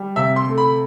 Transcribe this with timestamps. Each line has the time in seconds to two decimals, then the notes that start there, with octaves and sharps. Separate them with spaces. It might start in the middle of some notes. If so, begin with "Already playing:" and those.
Already playing: G3
0.16 C3 E5
0.36 C6
0.48 A3
0.58 B5